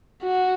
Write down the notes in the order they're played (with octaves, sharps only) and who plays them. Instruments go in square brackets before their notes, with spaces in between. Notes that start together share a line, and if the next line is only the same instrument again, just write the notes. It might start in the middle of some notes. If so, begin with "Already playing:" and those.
[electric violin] F#4